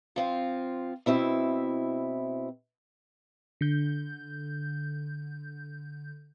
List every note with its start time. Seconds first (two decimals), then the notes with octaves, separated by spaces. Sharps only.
0.16 F3 C4 F4
1.06 B2 C4 E4 E5
3.61 D3 G6